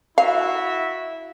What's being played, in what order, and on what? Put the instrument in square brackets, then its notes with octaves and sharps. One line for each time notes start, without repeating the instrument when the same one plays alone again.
[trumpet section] E4 F#4 E5 [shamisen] F5